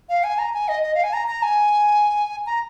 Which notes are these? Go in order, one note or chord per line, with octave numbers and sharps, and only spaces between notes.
F5
G#5
A#5
G#5
D#5
D#5
F5
G#5
A#5
A#5
G#5
A#5